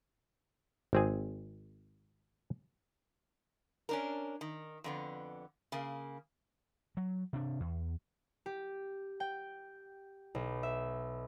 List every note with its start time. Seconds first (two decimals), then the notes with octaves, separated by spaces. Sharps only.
0.93 G#1 C4 G#4
3.89 C#4 D4 A#4
4.41 D#3
4.84 F2 D3 B3
5.72 C#3 A#3
6.97 F#3
7.33 C3 D4
7.60 E2
8.46 G4
9.20 G5
10.35 B1
10.63 E5